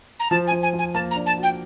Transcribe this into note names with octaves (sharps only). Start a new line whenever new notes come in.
A#5
F3 A5
G#5
F3
G#5
F3 G#5
A#3 A5
A#5
D4
A5
F#4
G5